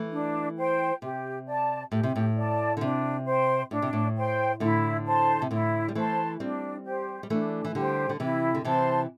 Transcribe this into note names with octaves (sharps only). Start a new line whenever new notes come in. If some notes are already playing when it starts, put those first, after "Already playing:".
Already playing: E3 A3
D4
C5 G5
C3 G4
D5 A5
A2 G4
C3
A2
D5 A5
D3
C3 D4
C5 G5 C6
A2 D4
C3
A2
C5 G5 C6
A2 D3 E4
C5 A5 C6
C3
A2 D3 E4
G3
E3 A3 C5 A5 C6
G3 C4 D4
G4 C5
G3
E3 A3 D4
E3
D3 G3 G4 C5
D3
C3 E3 E4
D3
C3 E3 C5 A5 C6